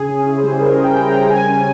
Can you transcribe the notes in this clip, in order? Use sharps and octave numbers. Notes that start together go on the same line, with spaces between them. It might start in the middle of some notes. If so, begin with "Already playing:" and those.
Already playing: C#3 G#4
C#4
E4
C5
G3
C#3 A#4
C#4
G5
E4
A#5
G3
C#3 G#5
C#4